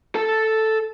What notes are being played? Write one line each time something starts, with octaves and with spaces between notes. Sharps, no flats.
A4 A5